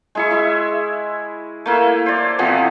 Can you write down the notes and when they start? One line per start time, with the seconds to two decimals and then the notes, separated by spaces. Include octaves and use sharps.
0.15 G#3 E4 C#6
0.31 E4 E5
1.66 A3 A#3 E4
2.06 C5 D5
2.39 C3 E3 F3 B3